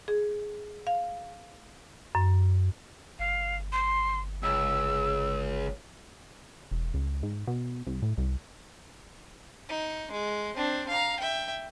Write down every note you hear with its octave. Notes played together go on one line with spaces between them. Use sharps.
G#4
F5
F#2
G1 F5
C6
C#2 E6
E1
C#2
G#2
B2
C2
A2
C2
D#4
G#3
C4 D4
F5 A#5
E5 G5